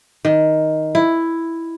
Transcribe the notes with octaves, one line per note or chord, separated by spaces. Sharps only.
D#3
E4